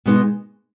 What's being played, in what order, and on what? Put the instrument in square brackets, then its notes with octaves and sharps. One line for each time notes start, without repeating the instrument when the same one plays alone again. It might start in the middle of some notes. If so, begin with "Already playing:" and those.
[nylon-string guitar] B2 G#3 B3 D#4